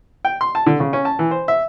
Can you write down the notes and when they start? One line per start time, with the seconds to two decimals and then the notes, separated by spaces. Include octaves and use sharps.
0.25 G5
0.41 C6
0.55 A5
0.66 D3
0.80 C#3
0.93 C#4
1.05 A5
1.19 E3
1.31 C5
1.48 E5